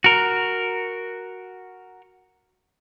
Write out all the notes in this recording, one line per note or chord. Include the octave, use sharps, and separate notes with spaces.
F#4 A#4